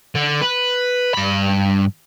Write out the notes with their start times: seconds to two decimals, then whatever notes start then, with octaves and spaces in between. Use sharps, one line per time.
0.15 D3
0.42 B4
1.14 G2 B5